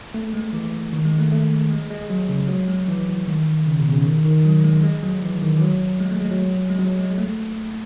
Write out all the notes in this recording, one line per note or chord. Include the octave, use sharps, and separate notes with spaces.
A3
G#3
E3
D#3
G#3
A3
A3
G#3
G#3
F#3
C#3
F#3
G#3
E3
D#3
C#3
B2
C#3
D#3
D#3
F#3
G#3
G#3
F#3
E3
D#3
E3
F#3
G#3
A3
G#3
F#3
G#3
F#3
G#3
A3